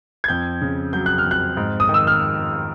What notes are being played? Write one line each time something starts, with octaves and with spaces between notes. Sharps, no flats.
G#6
F2 G6
C#3
F#3 G6
F#6
F6
F2
F#6
G#2
D#6
D#3
E6
F6